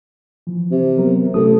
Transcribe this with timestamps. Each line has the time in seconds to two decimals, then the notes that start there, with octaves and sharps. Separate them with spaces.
0.47 E3 F3
0.71 C3
0.98 F#3 B3 A#4
1.34 A1 C3 A4 D#6